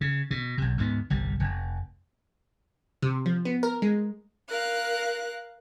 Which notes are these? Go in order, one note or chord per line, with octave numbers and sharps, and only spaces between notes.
C#3
B2
B1 C3
D2 G#2 F3 B3
G1 C2 G3
F1
C3
F3
B3
A#4
G#3
A#4 F5 F#6